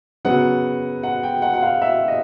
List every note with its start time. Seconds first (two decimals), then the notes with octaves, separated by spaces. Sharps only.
0.25 C#3 F#3 B3 F#5
1.03 F#5
1.23 G5
1.42 F#5
1.53 F#5
1.62 F5
1.82 E5
2.08 D#5